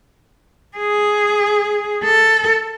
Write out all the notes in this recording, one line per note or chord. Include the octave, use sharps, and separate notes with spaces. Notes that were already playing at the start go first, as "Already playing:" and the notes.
G#4
A4